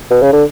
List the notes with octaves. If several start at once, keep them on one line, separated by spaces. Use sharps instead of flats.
B2
C#3
D3